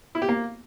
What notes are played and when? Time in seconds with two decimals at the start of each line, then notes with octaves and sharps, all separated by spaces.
0.15 E4
0.22 G4
0.29 A#3